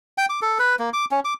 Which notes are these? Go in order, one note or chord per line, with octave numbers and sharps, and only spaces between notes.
G5
D6
A4
B4
A#3
D6
C#4
D6